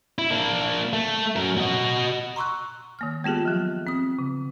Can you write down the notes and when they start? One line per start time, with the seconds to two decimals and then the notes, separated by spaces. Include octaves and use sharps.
0.19 E4
0.31 A#3 D4
0.93 A3
1.36 F#2 A#4
1.58 F#4 D#5
2.36 A#5 C6 C#6 E6 F#6
2.99 D#3 A#3 F6
3.24 G#3 B3 F4 G4 G#4
3.45 F3 F#3
3.87 C4 D#6
4.19 C#3